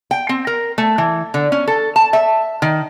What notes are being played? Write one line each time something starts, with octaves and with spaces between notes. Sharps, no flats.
G5
C4
A#4
A3
E3
D3
C#4
A4
A5
E5
D#3